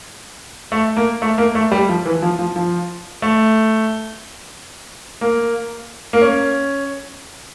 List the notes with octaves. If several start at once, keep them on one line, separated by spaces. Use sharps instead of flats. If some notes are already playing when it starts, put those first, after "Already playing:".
A3
A#3
A3
A#3
A3
G3
F3
E3
F3
F3
F3
A3
A#3
A#3
C#4